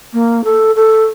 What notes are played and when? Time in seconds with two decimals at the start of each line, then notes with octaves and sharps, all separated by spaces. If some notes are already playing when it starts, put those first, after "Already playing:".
0.13 A#3
0.44 A4
0.76 A4